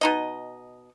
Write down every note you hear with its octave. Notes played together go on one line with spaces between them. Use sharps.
B2 D#4 D#5